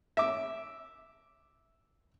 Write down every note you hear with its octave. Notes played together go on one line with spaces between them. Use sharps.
E5 D6